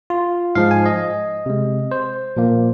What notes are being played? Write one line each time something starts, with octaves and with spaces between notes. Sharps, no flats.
F4
G#2 F3 G#3 F5
G#5
D#5
C3 G#3
C5
A#2 F3 A#3